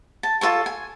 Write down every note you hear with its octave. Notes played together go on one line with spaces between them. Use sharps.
A5
F4 A4 C#5 A5
G#5